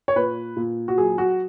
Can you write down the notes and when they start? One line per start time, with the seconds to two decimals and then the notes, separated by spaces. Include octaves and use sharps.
0.08 C#5
0.16 A#2 B4
0.57 A#2
0.88 F#4
0.98 F#3 G#4
1.18 F#4